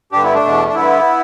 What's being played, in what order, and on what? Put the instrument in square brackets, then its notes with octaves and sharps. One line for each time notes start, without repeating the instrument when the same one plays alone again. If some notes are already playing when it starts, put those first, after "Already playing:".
[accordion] G2 D3 D4 G4
B3 E4
A3 D4
E2 B2
D4
G2 D3 B3 E4